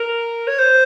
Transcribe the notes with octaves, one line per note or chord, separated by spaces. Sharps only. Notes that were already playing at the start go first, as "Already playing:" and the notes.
Already playing: A#4
C#5
C5